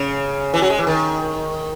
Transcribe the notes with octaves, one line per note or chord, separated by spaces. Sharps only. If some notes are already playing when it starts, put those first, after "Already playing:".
Already playing: C#3
E3
F#3
G#3
E3
D#3